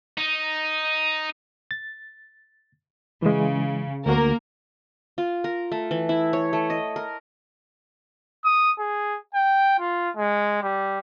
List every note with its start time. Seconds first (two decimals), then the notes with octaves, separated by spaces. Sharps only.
0.17 D#4
1.71 A6
3.22 C#3 E3 G#3
4.06 D2 A#3 F#4 A#4
5.18 F4
5.44 A#4
5.72 A3
5.91 E3
6.09 E4
6.33 C#5
6.53 A3
6.70 D#5
6.96 A#4
8.45 D#6
8.79 G#4
9.34 G5
9.79 F4
10.17 G#3
10.62 G3